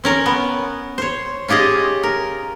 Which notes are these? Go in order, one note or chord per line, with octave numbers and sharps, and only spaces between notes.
C4 C#4 A#4
B3
C5 C#5
C#4 F4 G4 G#4 D#5
A#4